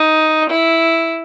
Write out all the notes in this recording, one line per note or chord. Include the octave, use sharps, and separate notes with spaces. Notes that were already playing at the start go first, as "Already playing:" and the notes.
Already playing: D#4
E4